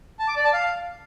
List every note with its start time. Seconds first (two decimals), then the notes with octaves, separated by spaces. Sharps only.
0.19 A5
0.28 D6
0.36 D5
0.45 A5
0.53 F5